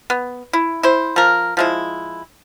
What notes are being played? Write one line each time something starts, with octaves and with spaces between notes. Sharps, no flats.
B3
E4
E4 C5
F3 A#4
F3 G#3 E4